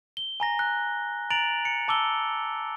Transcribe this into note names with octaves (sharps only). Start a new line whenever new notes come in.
G7
G#5 A#5 A#6
F#6
A#5 A6 D7 F7 F#7
C#7
A5 D6 E6 G7